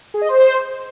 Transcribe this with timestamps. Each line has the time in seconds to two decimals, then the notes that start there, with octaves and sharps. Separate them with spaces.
0.14 G#4
0.21 D#5
0.29 C5